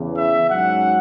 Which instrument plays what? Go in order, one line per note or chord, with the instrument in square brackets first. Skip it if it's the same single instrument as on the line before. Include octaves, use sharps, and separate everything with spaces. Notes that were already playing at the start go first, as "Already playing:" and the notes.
Already playing: [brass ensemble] E2 C#3 E3
E5
G#2 F#3 C#4 F#5